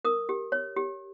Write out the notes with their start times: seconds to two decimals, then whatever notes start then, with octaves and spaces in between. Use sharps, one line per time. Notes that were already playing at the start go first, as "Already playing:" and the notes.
0.05 A#4 D#6
0.29 G4
0.52 C#5
0.76 G4